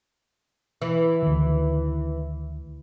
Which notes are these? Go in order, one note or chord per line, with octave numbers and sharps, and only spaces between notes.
E3
D2 D#3